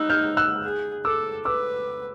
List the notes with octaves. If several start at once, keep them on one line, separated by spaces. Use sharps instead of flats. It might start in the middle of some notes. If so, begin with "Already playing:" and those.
Already playing: D#4 E6 F#6
F6 G6
E6 F#6
G#4
A4 D6 E6
B4 D6 E6